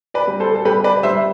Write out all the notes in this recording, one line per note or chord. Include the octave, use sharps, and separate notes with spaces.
B4 D5
G3
A4 C5
A4
G3 G4 B4
B4 D5
G3 C5 E5